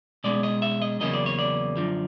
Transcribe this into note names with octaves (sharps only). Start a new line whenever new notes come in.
B2 G#3 C#4 D5
D#5
E5
D#5
E2 C#3 F#3 A#3 C#4 D#5
D5
C#5
D5
F#2 D3 F3